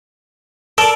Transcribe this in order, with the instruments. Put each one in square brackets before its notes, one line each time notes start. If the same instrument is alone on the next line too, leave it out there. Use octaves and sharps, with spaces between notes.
[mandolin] A4 [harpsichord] A#4 D5